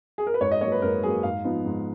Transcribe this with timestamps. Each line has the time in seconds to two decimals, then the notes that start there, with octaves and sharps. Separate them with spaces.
0.18 G#4
0.27 A#4
0.34 B4
0.41 G#2 C#5
0.51 D#5
0.61 F#3 A#3 C#5
0.72 B4
0.82 G#2 A#4
1.03 F#3 A#3 G#4
1.23 G#2 F5
1.44 F3 B3 D#4
1.66 G#2